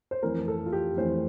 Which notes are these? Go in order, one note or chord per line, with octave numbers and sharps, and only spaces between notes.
C5
F2 E3 A3 A#4
A4
F4
G4
F2 E3 A3 C5